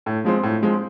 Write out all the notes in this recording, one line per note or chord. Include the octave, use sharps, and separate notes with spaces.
A2
F3 G#3 C4
A2
F3 G#3 C4